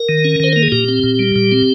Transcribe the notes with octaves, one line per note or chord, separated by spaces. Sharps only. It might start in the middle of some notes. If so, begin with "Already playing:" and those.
Already playing: A#4
D#3
C#4
D#3 C5
A#3 A#4
G#4
A#2 G4
C4
A#2
G3
A#2
C4